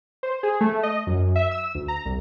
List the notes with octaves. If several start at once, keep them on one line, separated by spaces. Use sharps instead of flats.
C5
G#4
A3
D#5
F#2
E5
E6
D2
A#5
C2